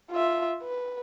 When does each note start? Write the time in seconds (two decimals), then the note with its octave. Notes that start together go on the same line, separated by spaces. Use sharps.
0.11 F4 E5
0.62 B4